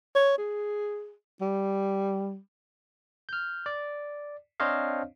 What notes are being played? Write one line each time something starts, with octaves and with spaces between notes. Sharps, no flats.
C#5
G#4
G3
F6 G6
D5
C4 D4 C5 C#5 D#5 F5